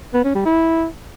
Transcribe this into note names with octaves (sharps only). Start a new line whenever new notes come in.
B3
C#4
G3
E4